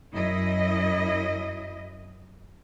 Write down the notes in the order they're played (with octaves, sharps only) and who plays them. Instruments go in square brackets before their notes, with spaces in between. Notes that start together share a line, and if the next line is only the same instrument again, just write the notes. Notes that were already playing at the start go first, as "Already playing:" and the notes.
[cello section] F#2 E4 D#5